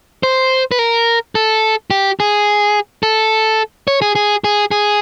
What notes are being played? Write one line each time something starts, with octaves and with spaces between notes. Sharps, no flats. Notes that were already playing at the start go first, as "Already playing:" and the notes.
C5
B4
A#4
A4
G4
G#4
A4
C#5
G#4
G#4
G#4
G#4